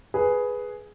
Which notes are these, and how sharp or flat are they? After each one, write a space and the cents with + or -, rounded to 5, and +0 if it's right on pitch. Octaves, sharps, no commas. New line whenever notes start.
G#4 +5 B4 +0